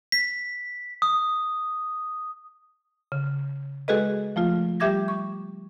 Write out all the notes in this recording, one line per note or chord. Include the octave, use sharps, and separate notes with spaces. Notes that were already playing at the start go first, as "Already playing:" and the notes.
B6
D#6
C#3
G#3 F#4 G#4 A4 B4 D#5
F3 A3 F4
G3 G4 E5 D6 G#6 A#6
C#6